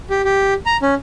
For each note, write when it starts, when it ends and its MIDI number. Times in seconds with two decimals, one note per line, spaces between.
0.10 0.22 67
0.25 0.54 67
0.66 0.77 82
0.82 0.95 61